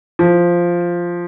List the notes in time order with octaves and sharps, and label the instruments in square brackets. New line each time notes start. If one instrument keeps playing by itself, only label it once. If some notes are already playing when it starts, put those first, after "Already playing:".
[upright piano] F3